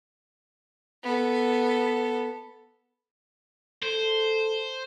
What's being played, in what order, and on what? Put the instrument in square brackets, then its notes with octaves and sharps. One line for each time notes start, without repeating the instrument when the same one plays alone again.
[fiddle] B3 A4
[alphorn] A4 [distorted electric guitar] C5